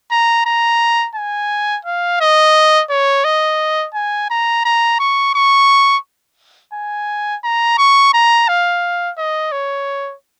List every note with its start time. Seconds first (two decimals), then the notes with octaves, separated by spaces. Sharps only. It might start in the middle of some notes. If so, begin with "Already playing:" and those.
0.11 A#5
0.46 A#5
1.15 G#5
1.85 F5
2.20 D#5
2.90 C#5
3.24 D#5
3.94 G#5
4.30 A#5
4.65 A#5
4.99 C#6
5.34 C#6
6.74 G#5
7.44 A#5
7.78 C#6
8.14 A#5
8.48 F5
9.18 D#5
9.52 C#5